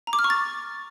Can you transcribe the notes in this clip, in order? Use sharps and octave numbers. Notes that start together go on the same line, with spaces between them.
A#5
D6
F6
C#6
A6